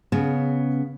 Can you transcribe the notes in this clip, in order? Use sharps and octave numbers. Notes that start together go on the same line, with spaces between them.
C#3 B3